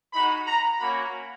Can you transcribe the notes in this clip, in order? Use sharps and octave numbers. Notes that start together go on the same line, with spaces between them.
G#3 D#4 F#4 B5
A#5
A#3 C#4 F#4 B5